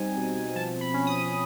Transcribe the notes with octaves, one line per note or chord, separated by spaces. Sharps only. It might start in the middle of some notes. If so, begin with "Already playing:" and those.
Already playing: G3 C4 D#4 G#5
B2
F3 A5
B5
C#4
D#6